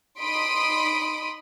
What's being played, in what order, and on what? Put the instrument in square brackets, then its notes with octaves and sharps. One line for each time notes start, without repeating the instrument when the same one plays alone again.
[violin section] D#4 B5 C6 D#6 B6 D7